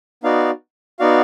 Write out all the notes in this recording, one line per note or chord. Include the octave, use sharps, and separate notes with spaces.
B3 D#4 F#4 D5 F5
B3 D#4 F#4 D5 F5